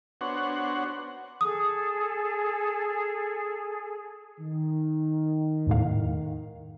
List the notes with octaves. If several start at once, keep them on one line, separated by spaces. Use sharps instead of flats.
B3 D4 F#4 C5 C#5 F#5
G#4 A4 D#6
D#3
E2 A2 F5